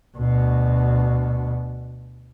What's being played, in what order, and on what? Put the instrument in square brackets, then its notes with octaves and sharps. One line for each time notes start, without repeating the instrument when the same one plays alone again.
[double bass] D2 B2